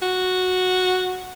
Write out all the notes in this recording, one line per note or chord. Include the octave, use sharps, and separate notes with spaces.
F#4